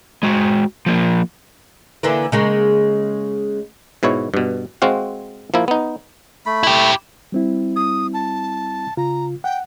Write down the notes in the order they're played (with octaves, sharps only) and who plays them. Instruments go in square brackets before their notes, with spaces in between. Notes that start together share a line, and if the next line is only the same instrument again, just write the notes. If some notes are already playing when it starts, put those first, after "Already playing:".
[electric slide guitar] G#3 F#4
F3 A#3
[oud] D3 E3 A#3
C#3 G#3 A#3
[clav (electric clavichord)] G#2 B2 E4 C#5
G2 B2
G#3 C4 F#4 F5
F3 A#3 E4
B3 D#4
[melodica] A3 B5
[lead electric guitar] E4 G4
[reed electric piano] G3 C4 E4
[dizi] D#6
A5
[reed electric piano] C#3 F4 [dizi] A#5
[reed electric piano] F#5 [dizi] G5